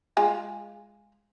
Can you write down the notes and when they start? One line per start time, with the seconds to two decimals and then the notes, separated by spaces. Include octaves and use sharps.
0.17 G#3 F4 G#5